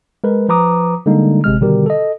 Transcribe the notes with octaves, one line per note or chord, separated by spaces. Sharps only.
G#3 A#4 B4
F3 B4 A#5 D6 D#6
D3 G3 G#3 A#3 D#4
G#1 C3 G#3 F6
B2 D3 D#3 G3 G4 A#4
A4 D#5